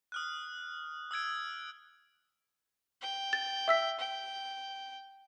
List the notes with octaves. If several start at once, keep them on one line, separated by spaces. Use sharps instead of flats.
D#6 F6 F#6
D#6 E6 G#6 D7
G5
A6
E5 E6 B6
G5